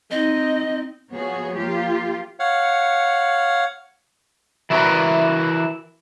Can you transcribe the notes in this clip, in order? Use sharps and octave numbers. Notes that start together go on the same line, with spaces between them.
C4 D#4 D#5
F3 B3 F#4 G#4 C#5
F3 A#3 F4 G4
C#5 F5 F#5
E3 E4 F#4 G#4 A#4 B4